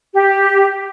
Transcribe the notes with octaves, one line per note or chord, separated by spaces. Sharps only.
G4